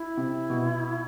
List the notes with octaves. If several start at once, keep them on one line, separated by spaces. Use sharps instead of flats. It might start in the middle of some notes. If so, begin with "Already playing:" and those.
Already playing: E4
C3
B2